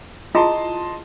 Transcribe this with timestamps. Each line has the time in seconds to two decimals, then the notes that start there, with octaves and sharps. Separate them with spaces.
0.35 E4 F4 G#4 D#5 A5 C6